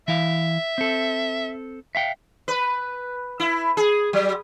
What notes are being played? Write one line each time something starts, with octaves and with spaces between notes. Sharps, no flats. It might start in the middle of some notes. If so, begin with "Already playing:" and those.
E3 E4 E5 F5
C4 A4
E5 F5 G5
B4
E4
G#4
F#3